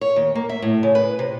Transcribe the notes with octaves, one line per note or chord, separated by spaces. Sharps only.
C#5
D#2
A#3
E5
A2
C#3
B4
C3